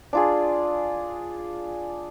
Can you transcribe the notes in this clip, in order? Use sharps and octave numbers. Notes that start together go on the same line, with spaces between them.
D4 F4 G#4